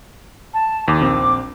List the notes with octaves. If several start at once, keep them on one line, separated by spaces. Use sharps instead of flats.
A5
D#2 D6
A#1 C4